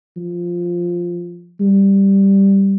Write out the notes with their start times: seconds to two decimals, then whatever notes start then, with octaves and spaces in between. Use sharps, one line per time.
0.17 F3
1.60 G3